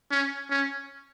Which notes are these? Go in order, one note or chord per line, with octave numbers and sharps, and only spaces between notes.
C#4
C#4